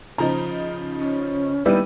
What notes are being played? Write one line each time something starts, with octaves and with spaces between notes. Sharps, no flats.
C#3 F3 D#4 A#5
C#4
G3 B3 D#4 E4 E6 D#7